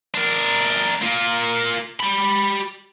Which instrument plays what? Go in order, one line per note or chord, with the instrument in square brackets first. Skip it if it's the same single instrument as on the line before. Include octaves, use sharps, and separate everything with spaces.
[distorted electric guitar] D4 A#4
A#3 F4
G4 B5